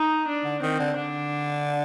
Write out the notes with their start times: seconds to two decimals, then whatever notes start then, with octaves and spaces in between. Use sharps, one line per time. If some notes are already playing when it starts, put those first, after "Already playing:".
Already playing: D#4
0.28 D4
0.45 D3
0.62 D#3 C4
0.80 D3
0.97 D3 D4